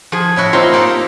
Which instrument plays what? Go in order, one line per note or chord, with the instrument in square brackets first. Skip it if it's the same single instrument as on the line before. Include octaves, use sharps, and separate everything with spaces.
[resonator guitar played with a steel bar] F3 G#4
[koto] A2 E4 F#4
[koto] A#3 C4 D#4 [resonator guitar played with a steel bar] F4
[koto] A#3 G4 A4